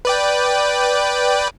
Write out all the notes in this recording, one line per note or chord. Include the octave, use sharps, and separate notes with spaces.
B4 D5 G5